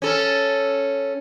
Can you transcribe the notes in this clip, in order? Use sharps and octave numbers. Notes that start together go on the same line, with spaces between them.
C#4 A4